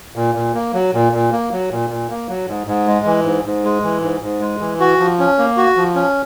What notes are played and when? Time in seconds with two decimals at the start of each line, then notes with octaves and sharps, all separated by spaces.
0.16 A#2
0.35 A#2
0.54 A#3
0.73 F#3
0.93 A#2
1.12 A#2
1.32 A#3
1.52 F#3
1.71 A#2
1.89 A#2
2.10 A#3
2.29 F#3
2.48 G#2
2.67 G#2
2.87 G#3
3.06 E3
3.25 G#2
3.45 G#2
3.65 G#3
3.83 E3
4.02 G#2
4.22 G#2
4.41 G#3
4.60 E3
4.80 F#4
4.99 F3
5.19 C#4
5.39 A#3
5.57 F#4
5.77 F3
5.95 C#4